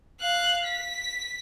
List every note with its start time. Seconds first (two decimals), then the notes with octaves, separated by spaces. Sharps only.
0.21 F5 F#6
0.65 B6